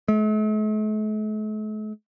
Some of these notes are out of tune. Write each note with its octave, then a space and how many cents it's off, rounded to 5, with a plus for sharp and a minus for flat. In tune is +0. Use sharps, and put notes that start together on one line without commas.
A3 -45